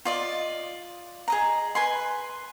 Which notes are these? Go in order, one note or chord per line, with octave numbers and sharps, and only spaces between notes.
F4 D5 D#5
G#4 D#5 A#5
B4 G#5 C6